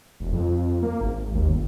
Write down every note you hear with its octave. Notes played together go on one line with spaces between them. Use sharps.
E1
F2
A#3
G#1
D#2
G1